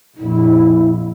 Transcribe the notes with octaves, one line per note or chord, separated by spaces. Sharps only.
A#1 F2 E4